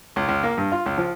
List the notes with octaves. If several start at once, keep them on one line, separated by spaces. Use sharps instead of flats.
C#2
C#2
A#3
G2
F4
C#2
F3